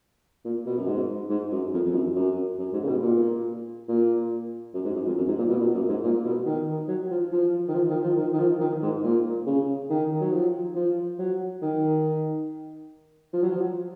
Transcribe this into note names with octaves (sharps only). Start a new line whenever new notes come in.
A#2
B2
F#2
G#2
G#2
F#2
F2
F2
F#2
F#2
F#2
G#2
C#3
B2
A#2
A#2
F#2
G#2
F#2
F2
F#2
G#2
A#2
B2
A#2
F#2
G#2
A#2
B2
D#3
F#3
F3
F3
D#3
F3
D#3
F3
D#3
D#3
F3
D#3
G#2
A#2
C#3
D#3
F#3
F3
F3
F#3
D#3
F3
F#3
F3